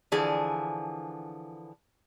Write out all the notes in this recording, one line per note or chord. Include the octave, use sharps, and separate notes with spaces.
D3 E3 F3 G#4